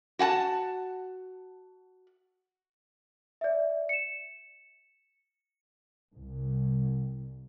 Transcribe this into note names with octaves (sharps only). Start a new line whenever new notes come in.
F#4 F#5 G#5 A5
D5 E5
C#7 E7
C2